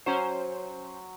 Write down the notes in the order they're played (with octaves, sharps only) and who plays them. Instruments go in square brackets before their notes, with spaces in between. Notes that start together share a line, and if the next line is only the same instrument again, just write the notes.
[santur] F#3 [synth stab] C#4 C5